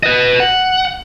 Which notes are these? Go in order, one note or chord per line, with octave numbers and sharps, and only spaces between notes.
B4 D#5
F#5